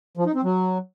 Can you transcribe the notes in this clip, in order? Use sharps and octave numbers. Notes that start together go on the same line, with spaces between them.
F3
D#4
C4
F#3